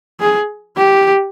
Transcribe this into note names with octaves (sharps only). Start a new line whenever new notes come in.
G#4
G4